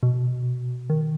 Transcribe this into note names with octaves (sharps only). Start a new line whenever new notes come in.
B2
D#3